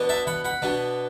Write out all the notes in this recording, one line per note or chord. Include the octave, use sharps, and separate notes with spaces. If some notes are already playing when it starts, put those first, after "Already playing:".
Already playing: B2 B3 D4
E5 A5
F#5 B5
F#5 B5
B2 B3 D4